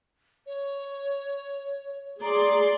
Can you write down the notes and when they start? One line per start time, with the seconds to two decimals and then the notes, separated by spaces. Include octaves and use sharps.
0.46 C#5
2.21 G#4 D5 A#5 C6